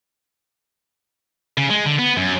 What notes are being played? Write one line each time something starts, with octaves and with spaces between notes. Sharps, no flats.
C#3
G#3
D3
B3
F#2